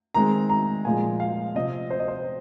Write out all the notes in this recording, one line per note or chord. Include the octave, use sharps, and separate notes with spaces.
D#3 G#3 C4 A#5
A#5
A#2 F3 G#3 G#5
F5
C3 F3 C4 D#5
C5
D#5
C5